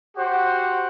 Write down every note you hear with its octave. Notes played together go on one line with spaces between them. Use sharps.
F#4 G4 C5 F#5